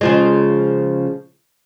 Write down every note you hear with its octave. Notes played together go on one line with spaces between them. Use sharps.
C#3 F3 G#3